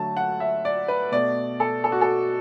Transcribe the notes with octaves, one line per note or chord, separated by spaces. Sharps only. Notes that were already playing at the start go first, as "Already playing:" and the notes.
Already playing: D3 F#3 A3 A5
F#5
E5
D5
B4
B2 A3 D5
A4
A4
F#4
A4